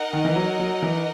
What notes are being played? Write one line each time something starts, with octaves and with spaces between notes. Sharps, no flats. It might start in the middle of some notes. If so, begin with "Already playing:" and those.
Already playing: D#4 A#4 D#5 F#5
D#3
E3
F#3
F#3
E3